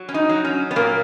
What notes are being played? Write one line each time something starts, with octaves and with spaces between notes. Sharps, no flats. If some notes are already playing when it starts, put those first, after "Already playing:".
Already playing: F#3
C#4
D#4
F#3
C#4
B3
A#2 A#3